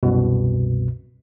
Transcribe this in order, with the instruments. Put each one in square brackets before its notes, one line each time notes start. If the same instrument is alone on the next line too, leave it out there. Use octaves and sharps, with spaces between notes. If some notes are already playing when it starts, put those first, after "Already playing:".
[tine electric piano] C2 F#2 B2